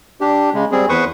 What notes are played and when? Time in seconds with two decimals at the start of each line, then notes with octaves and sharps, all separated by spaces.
0.21 D4 G4
0.54 C#3 G#3
0.72 G3 C4 G#4
0.89 E2 B4 C5 C#6 D#6